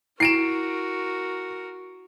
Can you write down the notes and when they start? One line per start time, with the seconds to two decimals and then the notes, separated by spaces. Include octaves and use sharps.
0.20 E4 F#4 A#4 C7 D7 E7